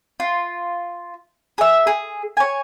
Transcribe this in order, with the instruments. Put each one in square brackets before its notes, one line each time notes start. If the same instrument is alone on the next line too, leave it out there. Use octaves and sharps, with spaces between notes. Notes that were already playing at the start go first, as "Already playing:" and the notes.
[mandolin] F4
G#4 E5
G#4
C#5 G#5